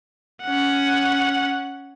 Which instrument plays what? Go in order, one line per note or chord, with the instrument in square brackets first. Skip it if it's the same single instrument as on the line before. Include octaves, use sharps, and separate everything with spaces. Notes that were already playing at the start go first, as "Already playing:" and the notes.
[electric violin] C#4 F#5